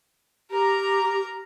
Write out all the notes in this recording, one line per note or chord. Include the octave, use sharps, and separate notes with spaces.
G4 A#4 A#5